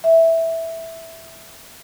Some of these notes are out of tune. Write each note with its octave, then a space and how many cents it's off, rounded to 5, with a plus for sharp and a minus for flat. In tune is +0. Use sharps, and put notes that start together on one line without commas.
E5 -5